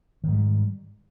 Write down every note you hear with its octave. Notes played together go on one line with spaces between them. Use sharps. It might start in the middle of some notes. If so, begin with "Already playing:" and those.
G#2 D#3 G3